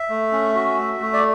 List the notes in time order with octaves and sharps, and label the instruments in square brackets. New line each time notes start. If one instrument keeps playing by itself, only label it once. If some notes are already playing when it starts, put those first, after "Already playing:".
Already playing: [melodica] E5
A3
C#4
F#4
A3
A3
D5